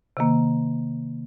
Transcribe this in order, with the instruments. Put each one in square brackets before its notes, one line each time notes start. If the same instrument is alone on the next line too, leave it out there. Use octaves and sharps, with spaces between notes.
[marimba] C3 D#3 A#3